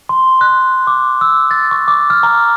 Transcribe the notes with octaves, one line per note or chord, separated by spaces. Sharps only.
C6
F#6
D6
E6
A6
C#6
D6
F6
A#5